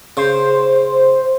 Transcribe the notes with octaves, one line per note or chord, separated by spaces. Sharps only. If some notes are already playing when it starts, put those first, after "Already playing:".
C#3 C5